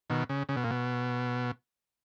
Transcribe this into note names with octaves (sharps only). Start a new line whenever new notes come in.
B2 D#3
C#3
C#3
B2
A#2
B2